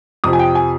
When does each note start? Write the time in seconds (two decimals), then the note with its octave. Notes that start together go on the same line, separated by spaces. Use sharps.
0.24 F2 C3 F3 D#6
0.33 G#5
0.39 G5
0.55 G#5